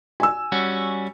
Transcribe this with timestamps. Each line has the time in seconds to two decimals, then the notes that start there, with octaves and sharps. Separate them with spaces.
0.20 G#5 E6
0.52 G3 C#4 F#4